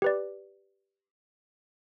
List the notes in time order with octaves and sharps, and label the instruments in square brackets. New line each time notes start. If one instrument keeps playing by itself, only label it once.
[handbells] G4 B4 D5